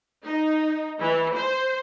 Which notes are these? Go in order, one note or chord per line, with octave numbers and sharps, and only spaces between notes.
D#4
E3
C5